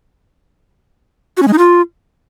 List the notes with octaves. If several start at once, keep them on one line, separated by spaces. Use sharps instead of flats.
F#4
C#4
G#3
D#4
F4